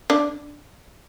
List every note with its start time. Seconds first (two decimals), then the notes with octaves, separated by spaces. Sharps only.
0.10 D4